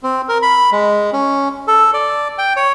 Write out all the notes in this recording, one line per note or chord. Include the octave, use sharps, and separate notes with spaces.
C4
A#4
B5
G#3
C#4
A4
D5
G5
C#5